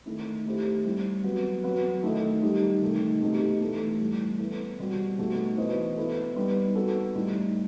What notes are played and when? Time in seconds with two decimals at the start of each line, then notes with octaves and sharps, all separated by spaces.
0.06 D#3 A3 E4
0.46 D#3 A3 E4 G4 C5
0.85 G3 C4 E4
1.24 F#3 B3 F#4
1.64 F#3 B3 F#4 B4
2.03 D#3 A3 E4 A4 D#5
2.43 D#3 G3 D#4 G4
2.82 C3 D#3 A3 D#4
3.21 B2 A3 D#4 G4
3.61 E3 A3 E4 A4
4.00 A2 E3 G3
4.39 B3 E4 A4
4.79 B2 G3 C4 F#4
5.18 B2 A3 D#4 F#4
5.57 E3 B3 F#4 C5 D#5
5.97 B3 E4 A4
6.36 G3 B3 D#4
6.75 B3 F#4 A4
7.15 A2 G3 D#4